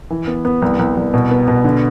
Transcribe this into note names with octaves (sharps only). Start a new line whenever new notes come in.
E3
B3
B3
C2
C2
C2
B2
B3
B2
D3